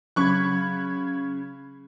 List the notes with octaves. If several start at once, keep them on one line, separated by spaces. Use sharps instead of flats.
C#3 F#3 B5 C#6 F#6 G#6